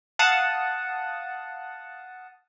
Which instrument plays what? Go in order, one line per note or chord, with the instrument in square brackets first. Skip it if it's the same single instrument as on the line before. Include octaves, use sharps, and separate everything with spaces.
[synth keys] F5 F#5 A5 D#6